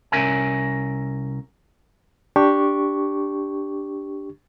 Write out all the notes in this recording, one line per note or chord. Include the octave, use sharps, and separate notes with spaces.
C2 C#3 C#4 A#4 E5 G#5
D4 G4 C#6